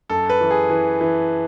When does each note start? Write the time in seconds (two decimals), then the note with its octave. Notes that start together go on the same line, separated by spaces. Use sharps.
0.10 F#2 A4
0.30 B4
0.41 E3
0.51 G#4
0.70 E3
1.01 E3